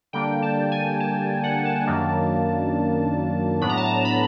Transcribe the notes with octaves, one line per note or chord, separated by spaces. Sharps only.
D3 G3 A#3 D4 G5
A5
G#5
A5
F#5
A5
F#2 D#3 F#3 A#3 D4
A2 F#3 B3 D4 B5
A#5
A5
A#5
B5